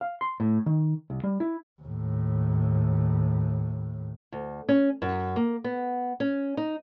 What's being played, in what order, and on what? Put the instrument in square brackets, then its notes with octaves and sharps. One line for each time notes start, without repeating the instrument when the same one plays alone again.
[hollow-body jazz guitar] F5
C6
A2
D#3
C2
G3
E4
[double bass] D#2 A2
[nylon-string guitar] D2
C#4
F#2
A#3
B3
C#4
D#4